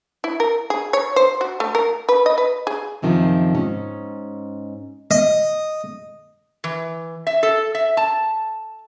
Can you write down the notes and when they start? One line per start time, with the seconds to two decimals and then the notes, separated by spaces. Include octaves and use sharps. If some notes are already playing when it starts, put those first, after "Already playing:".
0.24 E4
0.40 A#4
0.70 G#4
0.93 C#5
1.16 C5
1.41 F#4
1.60 A3
1.75 A#4
2.09 B4
2.26 D#5
2.38 B4
2.67 G#4
3.02 F#2 C3 D#3 F3
3.55 G#2 C#4
5.11 D#5
6.64 E3
7.27 E5
7.43 A4
7.75 E5
7.97 A5